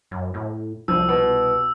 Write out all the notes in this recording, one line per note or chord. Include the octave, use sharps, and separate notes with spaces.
F#2
A2
C2 F3 E6
B2